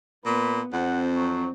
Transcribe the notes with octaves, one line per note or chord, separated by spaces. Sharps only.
A#2 B3 B4
F2 C4 F#5
F#3